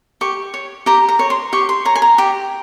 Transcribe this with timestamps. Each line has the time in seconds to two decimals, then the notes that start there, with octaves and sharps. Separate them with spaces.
0.21 G4 C#6
0.54 C#5
0.86 G4 A#5
1.09 A#5
1.19 C#5
1.30 C6
1.53 G4 C#6
1.69 C6
1.85 C#5 A#5
1.95 G#5
2.02 A#5
2.18 G4